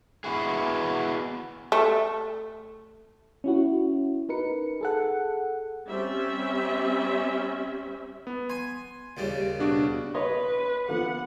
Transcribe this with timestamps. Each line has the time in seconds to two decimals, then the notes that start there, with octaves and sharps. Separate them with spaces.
0.24 B3 E4 F#4 G#4
1.72 A3
3.44 C#4 E4 F#4
4.29 D#4 A#4 B4 C#7
4.81 G#4 A4 F#5
5.87 G3 C4 C#4 E5
8.27 B3
8.50 G#5 C6
9.17 D#2 C#3 G3
9.59 B2 D4 F#4
10.14 B4 C#5 D#5 C6
10.88 D3 F3 B3 F#5